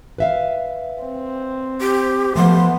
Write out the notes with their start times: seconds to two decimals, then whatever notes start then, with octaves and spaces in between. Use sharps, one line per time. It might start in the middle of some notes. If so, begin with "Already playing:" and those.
0.18 B4 E5 F5
1.03 C4
1.81 G4
2.36 F3 A3 B3 C6